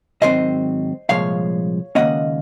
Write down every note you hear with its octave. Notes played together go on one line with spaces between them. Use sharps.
G#2 D#3 F#3 C4 C5 D#5
C2 A#2 F3 G#3 C#5 F5
C#2 C3 D#3 A#3 C#4 D#5 F#5